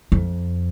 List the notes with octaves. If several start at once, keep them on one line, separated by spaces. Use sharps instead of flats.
F2